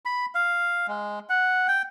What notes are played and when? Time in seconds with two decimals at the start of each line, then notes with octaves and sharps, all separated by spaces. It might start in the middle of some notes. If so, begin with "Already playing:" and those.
0.05 B5
0.35 F5
0.88 G#3
1.29 F#5
1.68 G5